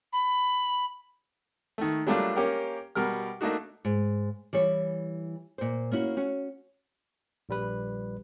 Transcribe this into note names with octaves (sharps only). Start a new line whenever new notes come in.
B5
D#3 A3
F#3 G3 A3 A#3 D4 F4
A#3 C#4 G4 A#4
B2 G3 A#4 F6
A3 A#3 D4 D#4 F#4
G#2
E3 G3 C#5
A#2 C5
A#3 C#4 E4 F#4
C#4 F#4
A#1 G3 B4